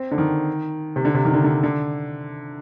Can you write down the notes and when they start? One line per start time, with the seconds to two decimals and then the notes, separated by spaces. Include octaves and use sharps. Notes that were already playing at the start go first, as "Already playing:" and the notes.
Already playing: C4
0.11 D3
0.18 D#3
0.96 C3
1.05 D3
1.14 C3
1.25 D#3
1.34 D3
1.44 D3
1.63 D3